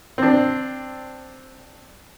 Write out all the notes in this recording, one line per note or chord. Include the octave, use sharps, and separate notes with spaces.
C4 D4